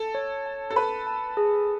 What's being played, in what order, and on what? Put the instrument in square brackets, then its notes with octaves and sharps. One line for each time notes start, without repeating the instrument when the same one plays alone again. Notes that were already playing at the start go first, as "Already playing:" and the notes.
Already playing: [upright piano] A4 [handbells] A5
[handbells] C#5
A5
[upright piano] A4
[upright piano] B4 [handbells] A5
[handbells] A5
G#4